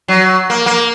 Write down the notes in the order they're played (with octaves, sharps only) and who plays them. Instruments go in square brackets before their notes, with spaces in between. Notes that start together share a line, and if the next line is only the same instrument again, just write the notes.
[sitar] F#3
A#3
A#3